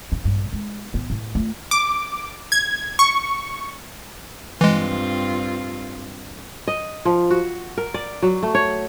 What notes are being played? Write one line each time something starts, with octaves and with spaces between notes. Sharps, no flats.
D4
A#1 G2
G#3
A1 B3
A2
A3 F4
D6
G#6
C#6
G2 E3 G#3 C4 F4
D#5
F3
F#4
A#4
D5
F#3
A3
C#5